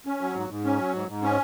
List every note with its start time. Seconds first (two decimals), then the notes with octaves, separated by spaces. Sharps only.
0.06 C#4
0.21 F#3
0.35 G#2
0.49 G#2
0.65 C#4
0.78 F#3
0.94 G#2
1.08 G#2
1.23 C#4